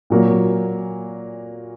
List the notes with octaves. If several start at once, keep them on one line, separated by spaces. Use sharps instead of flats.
A#2 F#3 A#3